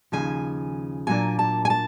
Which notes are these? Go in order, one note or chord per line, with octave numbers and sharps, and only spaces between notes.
D#2 C#3 F3 G#5
A#2 F#3 A#3 D4 G#5
A5
G#5
A5